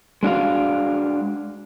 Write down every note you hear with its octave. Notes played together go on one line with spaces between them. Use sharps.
G#3 D4 F#4 F5